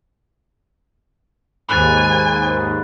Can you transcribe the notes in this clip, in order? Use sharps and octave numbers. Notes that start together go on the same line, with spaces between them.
D#2 G#2 G#5 B5 F#6 A6